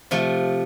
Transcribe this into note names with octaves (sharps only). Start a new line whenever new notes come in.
C3 F3 A3